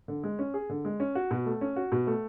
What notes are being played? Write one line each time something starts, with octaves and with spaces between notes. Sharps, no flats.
D3
G#3
C#4
G#4
D3
G#3
C#4
F#4
B2
A3
C#4
F#4
B2
A3